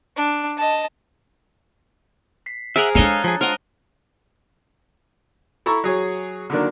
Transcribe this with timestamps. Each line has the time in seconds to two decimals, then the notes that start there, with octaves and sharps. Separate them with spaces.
0.16 D4
0.57 D#5 A5
2.46 B6 C7
2.76 G#4 A#4 C5 E5 F#5 G#5 D#6
2.95 G#3 D4 A4 C#5 D#5 F5 A#5 F#6
3.24 F3 G#4 A5 A#5
3.41 F4 A#4 C5 D#5 F#5 F#6
5.66 E4 A4 A#5 C#6 E6
5.84 F#3 G#4 C#5
6.50 D3 D#3 F#3 A#3 D4